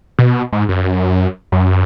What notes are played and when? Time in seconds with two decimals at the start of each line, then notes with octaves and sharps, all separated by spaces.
0.19 B2
0.53 G#2
0.69 F#2
1.52 F#2